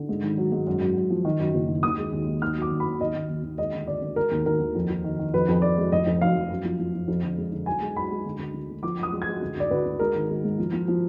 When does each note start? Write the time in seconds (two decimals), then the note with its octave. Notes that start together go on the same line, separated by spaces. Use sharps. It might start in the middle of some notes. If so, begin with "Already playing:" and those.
Already playing: D3
0.09 G#2
0.23 G#1
0.37 F#3
0.52 G#2
0.67 F#2
0.81 F#2
0.97 F#2
1.10 F3
1.25 D#3
1.39 F#2
1.54 F#1
1.68 D#3
1.83 D#2 D#6
1.98 G#3
2.13 D#2
2.27 D#3
2.42 D#2 F6
2.57 F#3 D6
2.72 D#2
2.80 B5
2.85 D#2
3.00 D#2 D#5
3.15 D#2
3.30 D#2
3.43 D#2
3.58 G#3 D#5
3.74 D2
3.87 D2 D5
4.02 D2
4.16 G#3 A#4
4.31 D#2
4.46 D#2 A#4
4.60 D#2
4.75 F2
4.90 F2
5.04 D#3
5.19 D#3
5.33 F2 B4
5.48 F2
5.62 F2 D5
5.77 G#3
5.92 F1 D#5
6.06 F2
6.21 F1 F5
6.35 F1
6.50 F#2
6.64 F3
6.79 F3
6.94 F3
7.08 F2
7.23 D3
7.37 G#3
7.52 D3
7.66 B1 G#5
7.81 G#3
7.96 B1 B5
8.11 G#3
8.25 D3
8.39 D2
8.54 D2
8.69 D3
8.83 F3 D6
8.98 F#2 D#6
9.12 G#3
9.22 G#6
9.28 G#3
9.42 D2
9.57 D2 D5
9.71 D2 B4
9.86 D2
9.99 G#3 A#4
10.15 G#1
10.30 G#3
10.44 G#2
10.58 F3
10.73 F3
10.88 F3